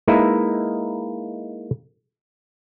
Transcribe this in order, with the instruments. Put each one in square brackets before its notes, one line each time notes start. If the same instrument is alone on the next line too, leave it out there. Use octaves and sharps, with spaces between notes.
[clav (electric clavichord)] G#3 A#3 D#4 E4 B4 E5